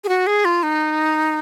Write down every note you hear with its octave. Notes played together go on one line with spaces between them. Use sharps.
G#4
F#4
G#4
F4
D#4